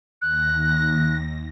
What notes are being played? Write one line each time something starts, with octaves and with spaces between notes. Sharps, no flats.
D#2 F#6 A#6